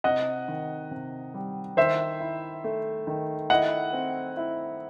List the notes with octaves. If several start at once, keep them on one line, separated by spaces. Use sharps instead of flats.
C3 D#5 F#5
D#3
C3
G3
D#3 C5 E5
E4
A3
D#3
E4 D#5 F#5
C4
E4